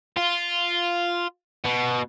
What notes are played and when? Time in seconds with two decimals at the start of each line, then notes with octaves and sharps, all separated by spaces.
0.17 F4
1.64 B2